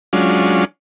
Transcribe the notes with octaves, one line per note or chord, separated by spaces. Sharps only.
F#3 G#3 C#4 D4 F4